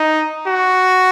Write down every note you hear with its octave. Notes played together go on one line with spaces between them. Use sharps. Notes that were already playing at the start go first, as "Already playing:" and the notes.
Already playing: D#4
F#4